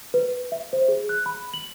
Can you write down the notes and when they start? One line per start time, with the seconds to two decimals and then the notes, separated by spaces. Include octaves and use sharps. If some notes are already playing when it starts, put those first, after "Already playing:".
0.14 B4
0.52 E5
0.73 C5
0.88 G#4
1.09 F#6
1.26 B5
1.54 F#7